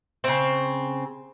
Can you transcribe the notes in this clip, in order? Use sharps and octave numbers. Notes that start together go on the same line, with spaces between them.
C#3 C4